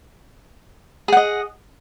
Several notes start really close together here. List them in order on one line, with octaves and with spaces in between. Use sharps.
G#4 F#5 D#5